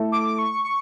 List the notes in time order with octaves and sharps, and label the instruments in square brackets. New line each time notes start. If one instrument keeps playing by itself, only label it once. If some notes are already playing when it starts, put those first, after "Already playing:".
Already playing: [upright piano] A3 E4 A4
[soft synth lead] D6
C#6
C#6